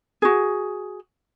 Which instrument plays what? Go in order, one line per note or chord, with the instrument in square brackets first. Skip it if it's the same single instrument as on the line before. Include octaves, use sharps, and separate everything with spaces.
[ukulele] F#4 G#4